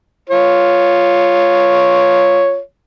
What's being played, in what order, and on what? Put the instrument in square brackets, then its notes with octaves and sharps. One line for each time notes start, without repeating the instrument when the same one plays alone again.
[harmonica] F4 C#5